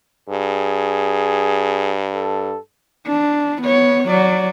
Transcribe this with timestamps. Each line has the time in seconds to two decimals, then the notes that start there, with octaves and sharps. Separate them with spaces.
0.29 G2 G#4
2.15 A4
3.07 D4
3.62 B3 C#5
4.08 F#3 D5